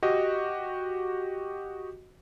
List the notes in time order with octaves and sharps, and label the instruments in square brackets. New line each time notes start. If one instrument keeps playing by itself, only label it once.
[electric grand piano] F#4 G4 D#5